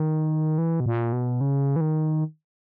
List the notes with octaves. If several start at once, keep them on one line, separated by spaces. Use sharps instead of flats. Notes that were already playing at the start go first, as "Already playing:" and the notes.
Already playing: D#3
E3
B2
A#2
B2
C#3
E3
D#3